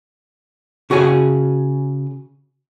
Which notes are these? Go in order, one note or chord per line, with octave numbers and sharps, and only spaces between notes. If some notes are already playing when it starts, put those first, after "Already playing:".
C#3 F#4 G#4 C#5 G#5